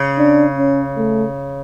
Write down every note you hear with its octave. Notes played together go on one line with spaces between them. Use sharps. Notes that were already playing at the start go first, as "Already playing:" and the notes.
Already playing: C#3
D4
C#4
A3